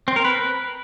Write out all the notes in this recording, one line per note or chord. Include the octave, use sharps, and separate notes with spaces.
C4
A#4
B4